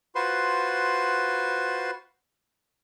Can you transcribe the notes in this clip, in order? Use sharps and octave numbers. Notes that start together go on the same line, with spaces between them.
F4 F#4 B4 C5 C6